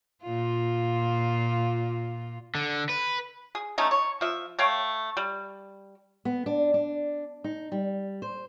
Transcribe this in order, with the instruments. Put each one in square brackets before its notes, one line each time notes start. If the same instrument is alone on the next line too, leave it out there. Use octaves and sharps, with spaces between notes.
[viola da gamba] A#2 F4
[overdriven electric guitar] D3
B4
[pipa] G#4
A3 C#4 D#4
C#5
F3 E5
A3 C#5 F5 G5
G3
[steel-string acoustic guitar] B3
D4
D4
D#4
G3
C5